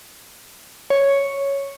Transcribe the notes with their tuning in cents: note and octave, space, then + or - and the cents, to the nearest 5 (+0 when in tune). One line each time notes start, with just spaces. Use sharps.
C#5 +0